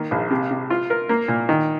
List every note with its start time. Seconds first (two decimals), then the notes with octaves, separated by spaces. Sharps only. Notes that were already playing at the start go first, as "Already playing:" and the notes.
Already playing: D#3 A#3
0.11 A#1
0.30 C3
0.50 C3
0.70 F4
0.90 A#4
1.09 A#3
1.28 A#2
1.49 D#3